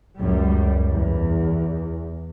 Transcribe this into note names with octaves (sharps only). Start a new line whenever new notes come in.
C#2 F#2 G3
E2